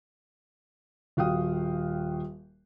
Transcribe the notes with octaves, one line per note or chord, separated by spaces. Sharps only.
D#1 F#4 F5 G5 D#6